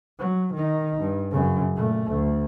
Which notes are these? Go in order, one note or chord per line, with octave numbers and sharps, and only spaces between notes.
F#3
D#3 D#4
G2
F#2 C#3
A#2 A3
D2